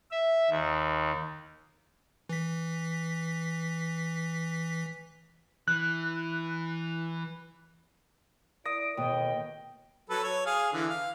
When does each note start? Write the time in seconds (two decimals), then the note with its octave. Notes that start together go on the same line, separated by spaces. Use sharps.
0.12 E5
0.50 D#2
2.29 E3 B6
5.68 E3 F#6
8.66 E4 A#4 D5 D#6 A#6 D7
8.97 D#2 B2 E3 A4 D#5 G5
10.10 F#3 A4 B4
10.23 C#5
10.46 G#4 F5
10.72 D3 E3
10.89 F5